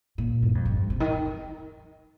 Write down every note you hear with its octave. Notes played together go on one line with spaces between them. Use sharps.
A#2
G2
F2
G2
C3
D#3